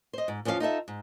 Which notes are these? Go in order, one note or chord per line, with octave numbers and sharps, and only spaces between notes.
C5 D#5
G#2
E2 F3 C#4 C#5 F5
D#4 F4 A4 E5
G#2